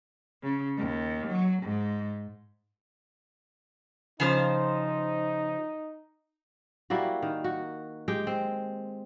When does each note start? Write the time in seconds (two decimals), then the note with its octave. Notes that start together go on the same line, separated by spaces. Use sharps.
0.43 C#3
0.77 D#2
1.27 F#3
1.63 G#2
4.20 C#3 F3 D#4 C5
6.90 G3 A#3 E4 F#4
7.22 D#3
7.44 F#4
8.08 G#3 G4 G5
8.27 C4